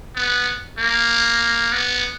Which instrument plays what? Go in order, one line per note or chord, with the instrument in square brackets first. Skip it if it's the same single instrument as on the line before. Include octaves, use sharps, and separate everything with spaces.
[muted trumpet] B3
A#3
B3